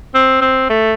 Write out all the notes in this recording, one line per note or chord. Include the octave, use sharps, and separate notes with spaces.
C4
C4
A3